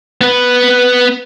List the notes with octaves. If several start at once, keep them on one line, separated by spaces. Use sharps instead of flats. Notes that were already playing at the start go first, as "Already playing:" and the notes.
B3 B4